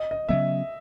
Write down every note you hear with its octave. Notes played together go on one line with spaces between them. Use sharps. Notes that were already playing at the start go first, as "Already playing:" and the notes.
Already playing: D#5
D#5
C#3 F#3 B3 E5